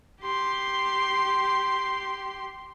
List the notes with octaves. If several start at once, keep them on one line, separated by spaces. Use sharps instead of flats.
G4 C6